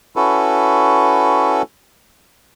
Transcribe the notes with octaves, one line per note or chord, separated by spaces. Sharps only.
C#4 E4 F#4 A4 B4